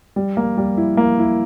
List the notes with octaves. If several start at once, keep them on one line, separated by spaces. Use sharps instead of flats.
G3
A#3
G3
E4
A#3
E4